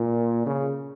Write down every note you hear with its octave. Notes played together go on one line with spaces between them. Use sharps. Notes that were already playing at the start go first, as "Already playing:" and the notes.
Already playing: A#2
C#3